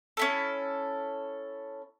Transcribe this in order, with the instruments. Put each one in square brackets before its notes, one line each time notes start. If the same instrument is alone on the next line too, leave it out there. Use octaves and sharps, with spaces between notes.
[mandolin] C#4 E4 A4